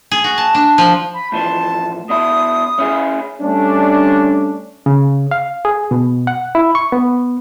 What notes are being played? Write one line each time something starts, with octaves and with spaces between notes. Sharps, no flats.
G#4
F#4
A5
D4
F3
B5
A2 E3 F3 A5
B2 D4 E4 D#6
C#4 E4 G#4
G3 A3 C#4 D4
C#3
F5
G#4
B2
F#5
E4
C#6
B3